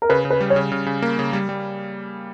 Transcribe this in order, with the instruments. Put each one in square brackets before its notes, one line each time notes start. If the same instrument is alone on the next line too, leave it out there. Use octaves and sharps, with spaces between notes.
[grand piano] A#4
[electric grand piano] C#3 [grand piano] B4
[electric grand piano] C#3
[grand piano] B4
[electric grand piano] G3
[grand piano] C#5
[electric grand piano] C#3
C#3
C#3
A#3
C#3
G3
G3